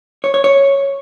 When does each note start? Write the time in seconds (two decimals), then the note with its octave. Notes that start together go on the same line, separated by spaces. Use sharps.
0.24 C#5
0.34 C#5
0.44 C#5